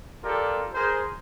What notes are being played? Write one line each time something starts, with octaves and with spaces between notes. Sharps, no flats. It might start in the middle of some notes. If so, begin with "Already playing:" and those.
F4 G4 A4 A#4 D5
G#4 A#4 C5